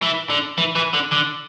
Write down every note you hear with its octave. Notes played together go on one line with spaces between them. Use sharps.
E3
D3
E3
E3
D3
D3